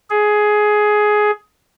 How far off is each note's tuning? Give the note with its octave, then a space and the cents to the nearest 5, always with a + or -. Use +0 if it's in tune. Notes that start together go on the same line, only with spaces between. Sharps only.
G#4 +15